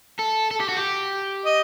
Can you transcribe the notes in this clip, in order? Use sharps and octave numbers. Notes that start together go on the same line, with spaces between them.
A4
A4
G4
F#4
G4
D#5